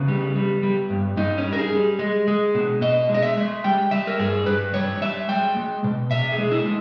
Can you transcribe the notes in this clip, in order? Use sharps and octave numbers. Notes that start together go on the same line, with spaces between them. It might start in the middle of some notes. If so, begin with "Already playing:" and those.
Already playing: C#3 B3
G3
G3
G3
G2
G2 D#4
C#4
G3
A#4
G#4
G3
G#3
G#3
B2
B2 D#5
G#3
D#5
E5
G#3
G3 G5
G3 E5
A#4
G2 G#4
G2 B4
G3 C#5
G3 E5
G#3 G5
G#3
B2
B2 E5
G#4
G#3
E4
G#3